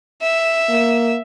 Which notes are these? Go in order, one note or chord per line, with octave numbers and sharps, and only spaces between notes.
E5
A#3